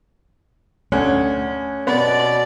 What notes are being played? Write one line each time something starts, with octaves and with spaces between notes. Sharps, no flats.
D2 C#4
B2 B3 D5